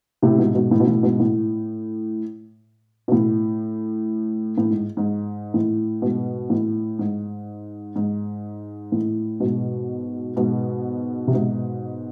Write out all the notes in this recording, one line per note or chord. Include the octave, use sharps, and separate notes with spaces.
A2 C3
G#2 B2
G#2 B2
A2
B2
A2
G#2 B2
A2
B2
A2
A2
G#2
G#2
A2
G#2 B2
A2
G#2
G#2
A2
G#2 B2
G#2 B2
C3
G#2 B2